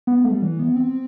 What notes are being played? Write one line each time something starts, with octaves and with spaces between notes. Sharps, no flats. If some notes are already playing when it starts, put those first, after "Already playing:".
B3
A3
G3
E3
B3
C4